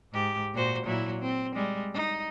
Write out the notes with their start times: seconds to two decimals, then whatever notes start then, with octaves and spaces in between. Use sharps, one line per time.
0.13 G#2 G4
0.54 A#2 F#4 C5
0.86 A#2 F#3 E4
1.21 C4
1.55 G3 G#3
1.94 D#4